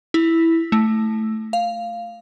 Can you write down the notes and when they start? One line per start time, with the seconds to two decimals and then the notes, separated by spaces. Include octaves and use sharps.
0.14 E4
0.72 A3
1.53 F5